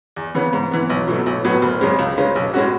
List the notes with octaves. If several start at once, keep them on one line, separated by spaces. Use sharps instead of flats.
E2
C#3 E3 B3
G#2
E3 B3
B1
B2 F#3 A3
B1
A2 F#3 B3
F#1
F#2 C#3 G#3 C#4
C#2
C#3 G#3 C#4
B1
A2 G#3 C#4 F#4